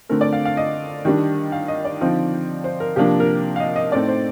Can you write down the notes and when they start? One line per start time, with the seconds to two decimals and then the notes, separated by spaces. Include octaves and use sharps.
0.09 D3 A3 C4 A#4
0.21 D5
0.33 F5
0.45 F5
0.57 D#5
1.05 D#3 G3 D4
1.52 F5
1.68 D#5
1.85 D5
2.01 D3 F3 C4 D#4
2.64 C5
2.80 A#4
2.96 C3 F3 A#3 D4 G4
3.20 A#4
3.56 F5
3.60 D#5
3.76 D#5
3.92 A2 A3 C4 D#4 D5
4.08 C5